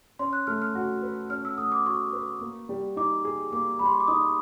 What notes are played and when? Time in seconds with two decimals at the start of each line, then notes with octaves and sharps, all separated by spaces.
0.19 C#4 C6
0.33 F#6
0.47 A3 F6
0.62 F6
0.75 F#4
1.02 B4
1.30 C#4 F6
1.45 E6
1.58 A3 D#6
1.72 D6
1.86 F#4 C#6
2.13 B4
2.41 A#3
2.69 G3
2.96 D#4 D6
3.25 G#4
3.52 A#3 D6
3.79 G3 B5
3.86 C6
3.93 C#6
4.00 D6
4.08 D#4 D#6